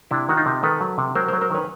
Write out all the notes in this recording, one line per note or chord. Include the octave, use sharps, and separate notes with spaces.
C3 D4 E4
D#3 F#4
D#4 F4
C3
D#3 A4 B4
F#3
C3
F#3 A#4 C5
A#4 C5
F#3
A#4 C5
D#3 B4 C#5